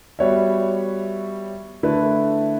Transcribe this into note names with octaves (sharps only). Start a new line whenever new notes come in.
G3 B3 F#4 C#5 E5
D3 A3 E4 B4